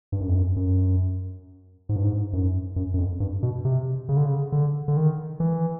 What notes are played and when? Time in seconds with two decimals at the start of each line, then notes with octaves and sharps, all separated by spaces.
0.12 G2
0.20 F#2
0.29 F2
0.35 F#2
0.56 F#2
1.89 G#2
1.96 G2
2.04 G#2
2.33 F#2
2.76 F#2
2.94 F#2
2.98 F2
3.20 G2
3.43 B2
3.65 C3
4.09 C#3
4.17 D3
4.26 C#3
4.52 D3
4.88 D3
4.97 D#3
5.40 E3